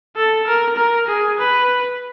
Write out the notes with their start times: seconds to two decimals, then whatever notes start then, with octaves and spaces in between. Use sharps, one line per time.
0.16 A4
0.47 A#4
0.76 A#4
1.08 G#4
1.38 B4